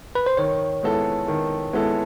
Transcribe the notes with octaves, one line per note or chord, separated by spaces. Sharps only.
B4
C5
D#3 C#5
G#3 B3 E4 A4
D#3
G#3 B3 E4 A4